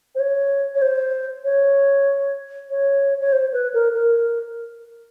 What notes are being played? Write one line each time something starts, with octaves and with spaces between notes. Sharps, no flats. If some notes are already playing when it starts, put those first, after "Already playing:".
C5
C#5
C#5
C5
C#5
C#5
C#5
C5
B4
A#4
A#4